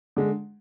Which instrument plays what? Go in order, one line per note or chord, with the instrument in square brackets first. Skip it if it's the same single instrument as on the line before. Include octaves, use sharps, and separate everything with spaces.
[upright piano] D3 G#3